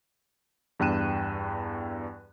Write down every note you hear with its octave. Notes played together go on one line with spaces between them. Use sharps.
E2 G2 G5 F#6 D#7 E7